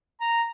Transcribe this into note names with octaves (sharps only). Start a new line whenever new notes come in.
A#5